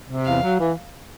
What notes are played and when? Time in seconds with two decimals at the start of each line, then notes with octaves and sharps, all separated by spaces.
0.09 C3
0.25 E2 F5
0.42 F#3
0.59 E3